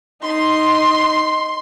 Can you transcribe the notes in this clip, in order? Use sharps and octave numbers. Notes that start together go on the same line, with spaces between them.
D#4 C6